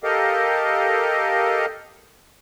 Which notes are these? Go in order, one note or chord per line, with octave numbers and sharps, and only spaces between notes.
G4 A4 A#4 D#5 F5